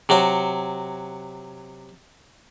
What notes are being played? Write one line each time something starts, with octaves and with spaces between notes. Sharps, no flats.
C3 F#3 F#4 C#5